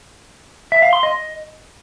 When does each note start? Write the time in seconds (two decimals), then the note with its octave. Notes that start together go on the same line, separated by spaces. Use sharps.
0.72 E5
0.82 F5
0.93 C6
1.03 D#5